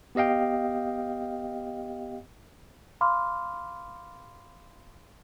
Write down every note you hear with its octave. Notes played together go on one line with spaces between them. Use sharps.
B3 G4 D#5 F5 G5
F5 B5 C6 D6 F6